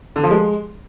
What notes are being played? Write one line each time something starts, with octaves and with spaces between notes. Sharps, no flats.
D3
F3
G#3